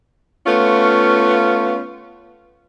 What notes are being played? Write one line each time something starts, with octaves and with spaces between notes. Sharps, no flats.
A3 B3 C#4 F4